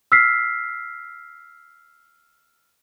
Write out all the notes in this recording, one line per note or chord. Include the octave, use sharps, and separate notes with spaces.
E6 F6 B6 C7